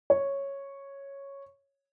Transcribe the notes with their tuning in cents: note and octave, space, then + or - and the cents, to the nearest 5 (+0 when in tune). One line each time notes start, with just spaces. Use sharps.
C#5 -5